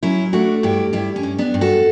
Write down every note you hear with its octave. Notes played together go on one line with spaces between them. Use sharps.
F#3 C#4 E4
A3 D4 F#4
G2 E4 G4
G2 E4 G4
C#4
G2
B3 D4
G2
F#4 A4